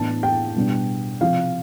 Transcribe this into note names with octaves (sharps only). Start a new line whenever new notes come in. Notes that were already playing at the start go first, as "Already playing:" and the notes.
Already playing: A2 E3 B3 D4 A5
G5
B2 G3 B3 D4
C3 F3 C4 F5